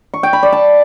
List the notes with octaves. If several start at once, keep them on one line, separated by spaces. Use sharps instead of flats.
C#6
G5
B5
D5
A5